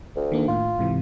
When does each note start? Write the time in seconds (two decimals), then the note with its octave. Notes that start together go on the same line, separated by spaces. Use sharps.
0.16 D2
0.32 D#3 A#3 D4
0.48 A2 F4
0.79 G#2 C3 E3